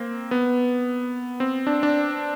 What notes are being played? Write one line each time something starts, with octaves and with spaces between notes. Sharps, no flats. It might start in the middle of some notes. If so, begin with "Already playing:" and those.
Already playing: A#3 C4
B3
C4
D4
D4